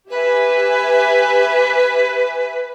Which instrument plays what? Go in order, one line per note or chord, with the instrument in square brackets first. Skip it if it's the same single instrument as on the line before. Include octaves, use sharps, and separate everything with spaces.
[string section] G4 E5 G#5 [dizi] B4